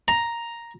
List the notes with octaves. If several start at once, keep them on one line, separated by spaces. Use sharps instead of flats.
A#5